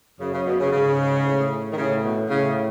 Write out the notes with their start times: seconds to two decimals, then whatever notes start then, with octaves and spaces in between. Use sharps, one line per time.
0.20 F#2 C#3
0.33 C#3
0.46 B2
0.60 C#3
0.72 G#2 C#3
1.25 A2
1.72 D#3
1.78 A2 C#3
2.04 B2
2.30 A2 C#3